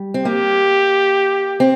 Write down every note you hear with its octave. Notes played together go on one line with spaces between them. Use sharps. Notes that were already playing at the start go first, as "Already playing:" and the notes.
Already playing: G3
C4
A#3 G4
C4